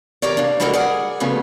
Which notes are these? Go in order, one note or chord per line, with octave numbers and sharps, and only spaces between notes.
E2 G4 A#4 C#5 D5
G3 A#3 D4
G3 G#3 A#3 F#4 A4 A#4
G#4 A#4 D5 F#5 G#5
C#3 F3 F#3 A3 B3 C#4